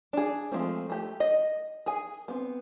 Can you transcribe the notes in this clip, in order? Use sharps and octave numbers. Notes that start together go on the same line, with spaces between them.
D4 G#4
F3 G#3 A3 C4
A3 G4
D#5
G#4 G#5
B3 C4